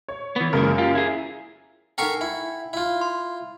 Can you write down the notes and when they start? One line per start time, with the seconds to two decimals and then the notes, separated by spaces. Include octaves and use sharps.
0.08 C#5
0.36 E3 B3
0.53 F#2 C#3 G#3 A#3 A#4
0.78 F4 G4
0.95 E4 G#4
1.98 D#4 A4 A#4 F#5 G5 C#6
2.21 E4
2.73 E4 F4
3.01 C6